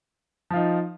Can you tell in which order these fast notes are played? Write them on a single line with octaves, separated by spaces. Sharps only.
F3 F4 D#4